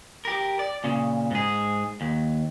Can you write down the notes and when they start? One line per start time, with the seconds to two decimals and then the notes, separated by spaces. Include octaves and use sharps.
0.25 G4 A#4
0.59 D5
0.84 A#2 C#3
1.31 G#2 G#4
2.01 D#2